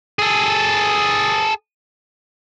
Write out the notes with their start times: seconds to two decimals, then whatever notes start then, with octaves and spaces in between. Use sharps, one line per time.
0.19 G#4 A4